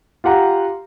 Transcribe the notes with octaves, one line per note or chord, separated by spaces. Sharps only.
F4 G4 F#5 A#5